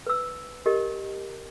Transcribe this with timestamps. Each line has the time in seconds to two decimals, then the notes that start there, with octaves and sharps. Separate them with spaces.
0.07 B4 E6
0.66 G4 A#4 D#5